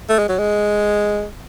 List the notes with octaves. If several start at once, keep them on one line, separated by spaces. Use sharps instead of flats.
A3
G#3
F#3
G#3